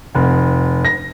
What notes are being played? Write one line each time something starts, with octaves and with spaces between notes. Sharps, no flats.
F1
A#6